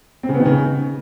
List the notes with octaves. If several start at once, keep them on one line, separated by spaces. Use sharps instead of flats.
C4
C#3
B3
D#3
C#3